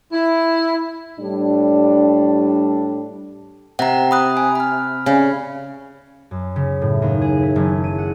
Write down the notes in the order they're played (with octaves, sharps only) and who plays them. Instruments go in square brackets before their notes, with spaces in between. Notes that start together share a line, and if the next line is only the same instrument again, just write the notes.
[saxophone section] E4
[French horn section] A2 G3 D4
[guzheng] C3 [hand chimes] F#5 A#5
[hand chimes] B5 D#6 F#6
G#5
B5 F6
[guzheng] C#3
[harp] F#2
C#3
A2
D#2
G#4
E4
F#1
D#7
F#5